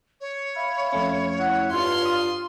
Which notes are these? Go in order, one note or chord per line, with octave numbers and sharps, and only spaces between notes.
C#5
E5 F5 B5
F2 A3 C#4
E4 E5 F#5
G2 F4 C6
D#6